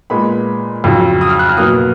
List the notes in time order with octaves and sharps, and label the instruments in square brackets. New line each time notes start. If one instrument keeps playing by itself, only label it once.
[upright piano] A#2 G#3 B3 B5
F2 C#3 F#3
D#6
F6
F#6
F6
B2 F#3 A#3 D#6